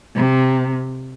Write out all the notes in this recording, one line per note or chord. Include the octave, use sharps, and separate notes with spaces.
C3